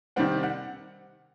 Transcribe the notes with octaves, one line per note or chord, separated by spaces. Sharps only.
C3 D#3 G3 C4 F#5
F#5